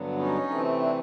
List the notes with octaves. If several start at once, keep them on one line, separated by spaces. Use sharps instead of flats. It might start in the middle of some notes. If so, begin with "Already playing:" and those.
Already playing: G2 D3 F#3 B3
C#4 D#4
C3 E3 A3 C4
D4 E4